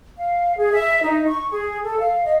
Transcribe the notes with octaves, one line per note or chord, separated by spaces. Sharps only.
F5
G#4
E5
D#4
C#6
G#4
A4
F5
D#5